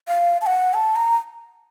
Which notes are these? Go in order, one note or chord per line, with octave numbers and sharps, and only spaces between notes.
F5
A5
F#5
A5
A#5